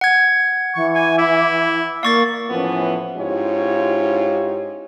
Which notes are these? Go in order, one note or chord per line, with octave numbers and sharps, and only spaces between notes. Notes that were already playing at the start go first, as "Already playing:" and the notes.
F#5 G#6
E3 C#6
G#5
E4
A#3 D5 F5 C#6 A6
A2 E3 F3 B3 C#4
G#2 C#4 E4 F4 G4 C#5